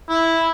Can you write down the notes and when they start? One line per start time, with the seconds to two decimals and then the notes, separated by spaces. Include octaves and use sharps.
0.10 E4